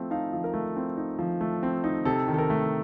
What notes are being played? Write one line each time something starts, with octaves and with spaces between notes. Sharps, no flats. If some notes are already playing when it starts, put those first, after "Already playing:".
Already playing: F3 A3 C4
D#4 F5 A5
F3
A#4
A3
C4
D#4
F3
A3
C4
D#4
C3 A4
D#3
A4
A#4
A3